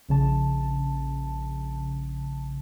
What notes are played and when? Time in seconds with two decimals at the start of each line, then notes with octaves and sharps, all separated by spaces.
0.09 A#1 C#3 A5